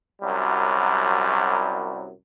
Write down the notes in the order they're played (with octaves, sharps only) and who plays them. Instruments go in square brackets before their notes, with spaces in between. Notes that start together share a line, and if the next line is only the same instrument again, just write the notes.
[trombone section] C2 F#2 F#3 G3